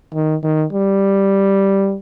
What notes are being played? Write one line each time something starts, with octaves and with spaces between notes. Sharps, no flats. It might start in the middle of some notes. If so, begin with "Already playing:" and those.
D#3
D#3
G3